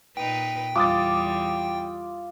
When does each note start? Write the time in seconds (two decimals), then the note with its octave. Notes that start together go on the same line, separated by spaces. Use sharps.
0.17 A#2 D#4 B4 G5
0.76 E2 G3 F4 D6 D#6 A6